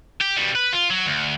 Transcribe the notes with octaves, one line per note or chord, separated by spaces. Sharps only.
G4
B2 G3
B4
F4
F#3
D2